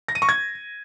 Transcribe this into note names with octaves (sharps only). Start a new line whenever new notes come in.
A#6
D#7
C#6
G#6